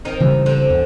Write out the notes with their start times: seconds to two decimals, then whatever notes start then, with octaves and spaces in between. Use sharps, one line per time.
0.05 D#3 C4 D#4
0.20 C#3 E3 G3
0.46 D3 C4
0.70 E2